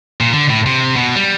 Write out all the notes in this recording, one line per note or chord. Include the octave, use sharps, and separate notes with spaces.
A#2
D3
A2
C3
B2
G3